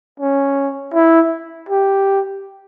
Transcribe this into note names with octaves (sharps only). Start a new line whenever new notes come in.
C#4
E4
G4